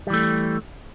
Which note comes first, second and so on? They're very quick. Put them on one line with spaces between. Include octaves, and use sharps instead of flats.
G3 E3 A3